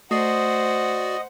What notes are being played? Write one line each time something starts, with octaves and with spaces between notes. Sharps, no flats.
A3 F#4 C5 D5 D#5 F#5 D#6 C7